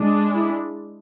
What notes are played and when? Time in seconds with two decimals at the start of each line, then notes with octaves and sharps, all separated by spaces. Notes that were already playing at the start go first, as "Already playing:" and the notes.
Already playing: G#3 D4
0.32 E4